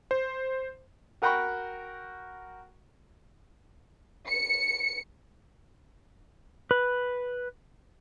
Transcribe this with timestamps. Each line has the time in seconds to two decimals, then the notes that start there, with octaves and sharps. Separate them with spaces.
0.11 C5
1.22 F#4 A#4 F#5 G5 B5 C#6
4.28 C#7
6.71 B4